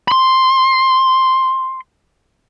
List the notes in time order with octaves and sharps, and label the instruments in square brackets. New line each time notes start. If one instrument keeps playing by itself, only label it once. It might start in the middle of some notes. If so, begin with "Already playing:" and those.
[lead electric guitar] B5 C6